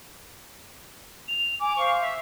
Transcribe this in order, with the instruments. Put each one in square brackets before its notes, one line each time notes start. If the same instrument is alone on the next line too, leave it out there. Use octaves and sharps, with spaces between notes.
[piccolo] F7
[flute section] G#5 [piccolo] D6
[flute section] C5 F5 [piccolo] C#6
[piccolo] E5